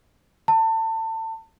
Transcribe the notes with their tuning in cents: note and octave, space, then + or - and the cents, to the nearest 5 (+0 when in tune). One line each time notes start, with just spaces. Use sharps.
A5 +30